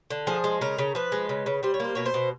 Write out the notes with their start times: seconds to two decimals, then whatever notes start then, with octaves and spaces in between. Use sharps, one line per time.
0.10 D3
0.27 F3 G#4
0.44 G#3
0.61 C#3 A#4
0.78 C#3
0.95 F3 B4
1.12 G#3
1.29 C#3
1.46 C#3
1.63 G3 C5
1.74 C#5
1.80 A#3 C5
1.95 B2 C#5
2.06 C5
2.14 B2